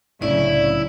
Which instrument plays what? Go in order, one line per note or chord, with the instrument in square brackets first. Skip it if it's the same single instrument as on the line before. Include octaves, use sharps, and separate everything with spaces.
[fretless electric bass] C2 A2 D4 [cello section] C#3 F#3 [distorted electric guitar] E4 [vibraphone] D5